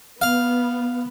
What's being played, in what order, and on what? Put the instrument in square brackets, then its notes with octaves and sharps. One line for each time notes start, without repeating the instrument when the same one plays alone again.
[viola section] B3 [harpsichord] F5